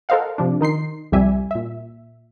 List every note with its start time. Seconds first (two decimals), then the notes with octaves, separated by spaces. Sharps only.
0.09 A4 A#4 C5 D#5 F5 F#5
0.38 C3 F3 D4
0.61 D#3 D#4 C6 C7
1.12 C2 F2 G3 E5 G#5
1.51 A#2 E5